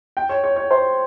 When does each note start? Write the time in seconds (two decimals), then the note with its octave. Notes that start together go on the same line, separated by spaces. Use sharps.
0.17 G5
0.29 C#5
0.44 C#5
0.56 C#5
0.71 C5